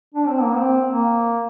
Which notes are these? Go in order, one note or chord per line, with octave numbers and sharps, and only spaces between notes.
D4
C4
A#3
C4
A#3